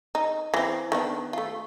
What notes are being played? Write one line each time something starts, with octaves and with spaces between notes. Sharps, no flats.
D#4
E3 C4
D#3 B3 D4
A3 F4